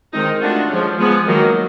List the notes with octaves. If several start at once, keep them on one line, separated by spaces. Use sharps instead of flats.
D#3 G#3 C4 D#4
A3 D4 F4 F#4
F3 G#3 C#4
F3 G#3 B3 G#4
D#3 F#3 A#3